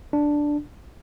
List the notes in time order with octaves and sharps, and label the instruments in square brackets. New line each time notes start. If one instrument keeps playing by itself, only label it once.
[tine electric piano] D4